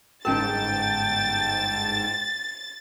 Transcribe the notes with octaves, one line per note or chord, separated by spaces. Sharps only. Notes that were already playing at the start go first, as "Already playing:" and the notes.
G1 G#2 C#4 A#4 G5 A5 A6